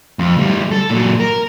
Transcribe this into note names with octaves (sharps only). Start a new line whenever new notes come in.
F2
D2 G3
A4
A#2 F#3
A#4